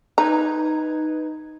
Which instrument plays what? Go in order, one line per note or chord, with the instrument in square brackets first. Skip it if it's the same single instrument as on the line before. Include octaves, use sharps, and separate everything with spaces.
[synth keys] D#4 B4 G#6 [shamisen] A#5